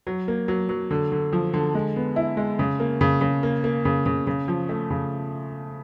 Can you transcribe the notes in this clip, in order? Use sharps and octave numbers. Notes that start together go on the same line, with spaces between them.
F#3
A#3
F#3
F#3
D3
D3
F3
D3
G#3
B3
E4
G#3
C#3
A#3
C#3
C#3
A#3
A#3
C#3
C#3
C#3
F3
A3
C#3